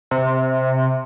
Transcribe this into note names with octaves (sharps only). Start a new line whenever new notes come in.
C3